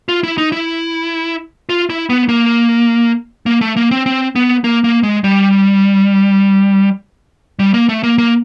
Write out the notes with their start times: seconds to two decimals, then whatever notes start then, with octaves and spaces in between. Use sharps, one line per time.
0.09 F4
0.23 E4
0.38 D#4
0.52 E4
1.69 F4
1.90 E4
2.10 B3
2.29 A#3
3.46 A#3
3.61 A3
3.76 A#3
3.91 C4
4.06 C4
4.36 B3
4.64 A#3
4.84 A#3
5.03 G#3
5.24 G3
7.59 G3
7.74 A#3
7.89 A3
8.03 A#3
8.18 A#3